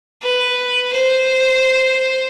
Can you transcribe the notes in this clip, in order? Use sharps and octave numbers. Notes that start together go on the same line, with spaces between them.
B4
C5